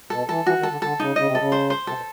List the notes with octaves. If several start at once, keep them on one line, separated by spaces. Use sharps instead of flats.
B2 A4
E3 A4
E3 F#4
D#3
A4
D3
D3 A4
C#3 D#4
C#3 D#5
C3
C#3 A4
C5
C5
C3 A4
B2